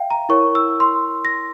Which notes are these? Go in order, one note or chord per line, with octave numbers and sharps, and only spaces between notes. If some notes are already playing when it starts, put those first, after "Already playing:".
Already playing: E5 F5 G5
A#5
E4 A#4 C#5 C#6
E6
C6
A#6